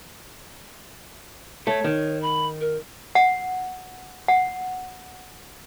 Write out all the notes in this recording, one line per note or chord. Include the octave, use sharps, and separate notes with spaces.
A3 C#5
D#3
B5
A#4
F#5
F#5